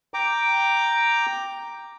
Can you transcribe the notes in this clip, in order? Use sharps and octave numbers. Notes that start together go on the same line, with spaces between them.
G5 A#5 D6